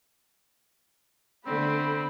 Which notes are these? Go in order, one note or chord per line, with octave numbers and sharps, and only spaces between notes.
D3 A3 B3 C4 B5